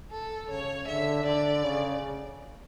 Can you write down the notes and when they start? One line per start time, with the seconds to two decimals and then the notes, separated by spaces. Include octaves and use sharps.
0.11 A4
0.49 C#3 C#5
0.88 D3 E5
1.25 D3 D5
1.63 C#3